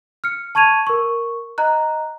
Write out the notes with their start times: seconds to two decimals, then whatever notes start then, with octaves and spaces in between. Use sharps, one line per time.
0.24 F6 C#7
0.55 A5 C#6 G#6 D#7 F7
0.87 A#4 C#6
1.58 D#5 A#5 F#6